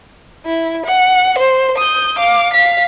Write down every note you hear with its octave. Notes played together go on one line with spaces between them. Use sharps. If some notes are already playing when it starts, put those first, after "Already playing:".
E4
F#5
C5
D#6 G6
F5 D6
F5 B6